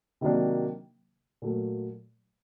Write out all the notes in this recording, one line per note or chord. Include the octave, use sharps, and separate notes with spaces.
C3 D#3 F#3 A#3 D4
A#2 F#3 A3